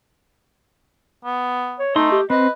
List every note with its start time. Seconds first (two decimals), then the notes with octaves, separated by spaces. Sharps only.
1.25 B3
1.79 C#5
1.96 A3 D#4 D#5 C6
2.12 G4
2.30 C4 B4 D#5